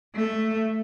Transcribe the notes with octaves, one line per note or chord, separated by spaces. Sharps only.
A3